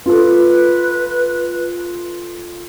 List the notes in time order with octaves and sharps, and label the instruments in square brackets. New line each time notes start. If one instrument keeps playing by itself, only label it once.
[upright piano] F4 A4 [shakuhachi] B4